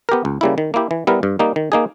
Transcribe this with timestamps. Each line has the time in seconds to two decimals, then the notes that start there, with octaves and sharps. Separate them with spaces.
0.09 B3 G4 A#4
0.25 C#2
0.41 C#3 G3 A#3 E4
0.58 D#3
0.74 A#3 E4 G4
0.91 E3
1.07 G3 B3 E4 A#4
1.23 G2
1.39 G3 A#3 D#4
1.56 D#3
1.72 A#3 D#4 G#4